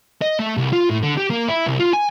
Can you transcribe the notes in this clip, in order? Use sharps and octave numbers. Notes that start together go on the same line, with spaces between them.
D#5
A3
C2
F4
A2
D3
G4
A#3
E4
C2
F4
G#5